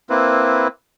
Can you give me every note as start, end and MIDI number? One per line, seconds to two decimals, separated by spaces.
0.10 0.68 58
0.10 0.68 60
0.10 0.68 64
0.10 0.68 71